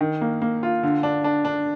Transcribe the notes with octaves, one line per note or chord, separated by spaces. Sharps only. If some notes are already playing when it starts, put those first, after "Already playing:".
D#3
A#3
A#3
F4
D3
D4
D4
D4